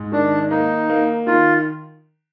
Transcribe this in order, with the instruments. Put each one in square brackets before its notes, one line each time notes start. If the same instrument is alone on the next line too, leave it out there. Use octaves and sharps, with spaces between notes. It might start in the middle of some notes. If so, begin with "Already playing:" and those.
Already playing: [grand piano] G#2
[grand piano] D#3 [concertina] D4
[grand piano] A#3 [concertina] D#4
[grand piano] A#3
[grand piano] D#3 [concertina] F4